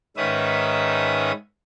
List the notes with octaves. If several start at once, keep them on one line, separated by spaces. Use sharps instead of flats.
G#2 D#3 C#4 B4 E5 D#6